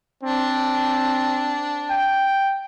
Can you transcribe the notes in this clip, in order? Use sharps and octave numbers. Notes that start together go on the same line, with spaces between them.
C4 D4
G5